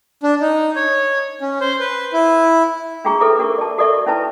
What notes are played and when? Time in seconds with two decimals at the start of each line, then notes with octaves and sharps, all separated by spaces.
0.23 D4
0.41 D#4
0.76 C#5
1.41 C#4
1.61 C5
1.80 B4
2.13 E4
3.05 D4 F4 F#4 G#4 A#5 C#6
3.21 D#4 A4 B4 E5 D6
3.39 D4 F#4 A#4 C#6
3.58 D5 A5
3.78 F#4 A4 A#4 D5 E5 C#6
4.06 C#4 D#4 E4 B4 A5